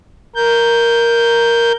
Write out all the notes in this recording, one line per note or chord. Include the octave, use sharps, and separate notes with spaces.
A#4 G6